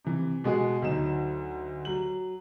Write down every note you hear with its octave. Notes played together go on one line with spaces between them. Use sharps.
C3 E3
B2 G#3 F#4 G#4
D2 F#3 D#4 E7
F#3 F#7